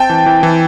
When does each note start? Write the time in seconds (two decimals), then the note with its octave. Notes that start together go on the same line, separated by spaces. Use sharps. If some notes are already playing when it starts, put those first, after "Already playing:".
Already playing: C4 G5 A5
0.10 E3
0.26 E3
0.43 E3